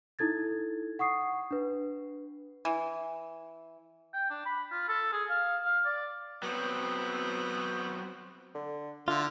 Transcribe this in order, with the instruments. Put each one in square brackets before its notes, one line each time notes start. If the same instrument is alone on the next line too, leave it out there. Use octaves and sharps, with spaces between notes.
[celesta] D#4 E4 A4 G#6 A6
F#5 C#6 D#6 C7
D4 B4
[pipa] E3
[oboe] G5
D4
B5
F4
A4
G#4
F5
F5
D5
[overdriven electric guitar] F#3 C4 [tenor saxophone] B3
[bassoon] D3
[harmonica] D3 [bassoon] A3 [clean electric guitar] F4